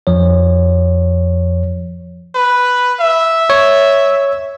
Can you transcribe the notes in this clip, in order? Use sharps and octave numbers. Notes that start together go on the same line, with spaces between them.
F2 F3 C#5
B4
E5
C#5